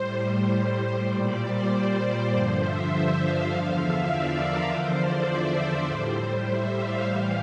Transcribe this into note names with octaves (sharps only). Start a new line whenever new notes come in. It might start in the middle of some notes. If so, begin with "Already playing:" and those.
Already playing: A2 G3 C5
C5
C5
A#2 G3 D5
C5
C5
G2 D3 F3
E5
F5
E2 D3 F3
E5
D5
A#4
E2 D3 F3 C5
D5
E5
E5
A2 G3 C5
E5
F5
A2 E3 G3 F5